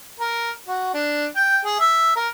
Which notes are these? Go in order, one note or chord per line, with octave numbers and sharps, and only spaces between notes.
A#4
F#4
D4
G5
G#4
E5
A#4